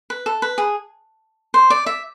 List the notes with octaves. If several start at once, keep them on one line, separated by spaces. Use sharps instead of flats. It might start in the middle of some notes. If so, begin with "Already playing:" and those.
B4
A4
B4
G#4
C5
D5
E5